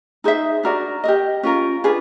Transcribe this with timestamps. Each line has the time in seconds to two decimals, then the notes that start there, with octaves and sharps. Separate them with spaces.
0.24 D#4 G#4 C5 E5
0.63 D4 F#4 A#4 D5
1.04 G4 A#4 D#5
1.43 C#4 F4 A#4
1.84 D4 F4 G#4 B4